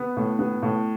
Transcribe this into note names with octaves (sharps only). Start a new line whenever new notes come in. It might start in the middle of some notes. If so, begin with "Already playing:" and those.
Already playing: B3
A2
B3
A2